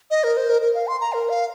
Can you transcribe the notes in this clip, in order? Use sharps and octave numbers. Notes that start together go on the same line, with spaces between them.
D#5
A#4
C5
A#4
A#4
F5
C6
A#5
A#4
F5